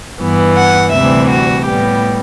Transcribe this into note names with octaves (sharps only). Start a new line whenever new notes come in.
G2 E3 B3
F#5
D2 C3 E3 G3 E5
F#4
A2 G3 B3 G4